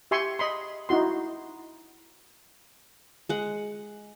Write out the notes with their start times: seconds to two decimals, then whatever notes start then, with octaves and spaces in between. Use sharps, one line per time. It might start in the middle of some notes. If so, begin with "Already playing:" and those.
0.11 G4 E5 G#5 C6 C#6
0.39 D#5 B5 C6
0.89 D#4 E4 F#4 C6
3.29 G#3 F#5